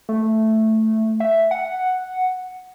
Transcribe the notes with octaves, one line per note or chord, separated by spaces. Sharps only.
A3
E5
F#5